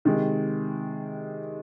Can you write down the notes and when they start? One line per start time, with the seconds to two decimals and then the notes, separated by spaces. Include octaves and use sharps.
0.05 C3 D#3 G#3